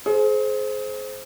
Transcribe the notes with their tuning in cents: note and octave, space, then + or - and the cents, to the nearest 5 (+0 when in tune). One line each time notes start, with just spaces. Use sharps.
G#4 +35 C5 +0